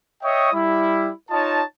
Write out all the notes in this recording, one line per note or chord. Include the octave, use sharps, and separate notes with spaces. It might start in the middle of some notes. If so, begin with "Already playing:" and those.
C#5 D#5 E5 G5 C#6 D#6
G3 E4
D#4 F4 C#5 D#5 A5